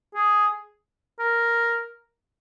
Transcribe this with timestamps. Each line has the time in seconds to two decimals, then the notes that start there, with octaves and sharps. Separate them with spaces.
0.15 G#4
1.19 A#4